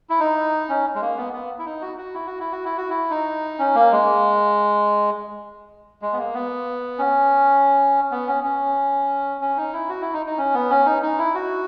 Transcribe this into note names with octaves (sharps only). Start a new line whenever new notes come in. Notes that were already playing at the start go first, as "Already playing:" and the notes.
E4
D#4
C#4
G#3
A#3
B3
B3
E4
D#4
F#4
F#4
E4
F#4
E4
F#4
E4
F#4
E4
D#4
C#4
A#3
G#3
G#3
B3
A#3
B3
C#4
B3
C#4
C#4
C#4
D#4
E4
F#4
E4
D#4
D#4
C#4
B3
C#4
D#4
D#4
E4
F#4